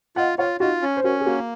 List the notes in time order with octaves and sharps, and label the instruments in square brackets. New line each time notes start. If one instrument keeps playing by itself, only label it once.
[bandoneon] F4 [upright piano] D#5 F#5
[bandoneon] F4 [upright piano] C#5 F5
[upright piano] D#4 F#4 [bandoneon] F4
[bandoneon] C#4
[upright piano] C5
[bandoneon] C#4 [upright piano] F#4 A#4
[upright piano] G#4
[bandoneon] A#3 [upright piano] F#4 A#4